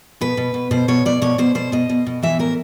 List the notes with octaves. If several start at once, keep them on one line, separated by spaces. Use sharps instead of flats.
B2 B4
B2
B2
B2 C5
B2 C#5
B2 D5
B2 C#5
B2 C5
B2 C5
B2 D#5
B2
B2
E3 E5
A2 A#4